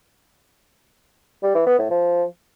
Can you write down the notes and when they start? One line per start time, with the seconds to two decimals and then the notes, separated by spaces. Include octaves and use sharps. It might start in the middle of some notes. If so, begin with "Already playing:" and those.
1.43 G3
1.55 E3
1.67 B3
1.79 A2
1.91 F3